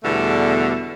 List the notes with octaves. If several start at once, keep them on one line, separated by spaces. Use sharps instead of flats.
E2 B2 D3 G3 A3